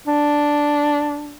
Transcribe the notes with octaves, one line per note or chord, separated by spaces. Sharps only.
D4